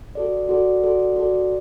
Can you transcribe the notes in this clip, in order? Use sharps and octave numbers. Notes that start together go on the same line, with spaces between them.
F#4 A4 D5
F#4 A4 D5
F#4 A4 D5
F#4 A4 D5